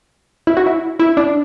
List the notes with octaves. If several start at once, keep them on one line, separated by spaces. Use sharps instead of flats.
E4
F#4
E4
E4
D4